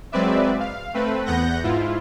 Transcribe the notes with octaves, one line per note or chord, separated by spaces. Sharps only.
F#3 G#3 C4 B4 D5 E5
F5
A3 C4 B4
E2 B3 F#5 G6 A#6
G#2 E4 F4